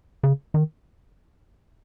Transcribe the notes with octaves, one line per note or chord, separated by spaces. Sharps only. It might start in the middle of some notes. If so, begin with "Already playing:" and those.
C#3
D#3